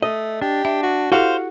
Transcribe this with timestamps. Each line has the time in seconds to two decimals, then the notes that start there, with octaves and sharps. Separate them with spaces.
0.02 A3 D#5
0.42 D4 G4
0.65 D4 E5
0.83 F#4
1.12 E4 F#4 G4 A4 C5 F5 F#5